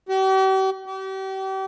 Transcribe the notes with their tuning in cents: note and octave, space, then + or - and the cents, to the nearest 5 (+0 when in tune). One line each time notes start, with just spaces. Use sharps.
G4 -45
G4 -40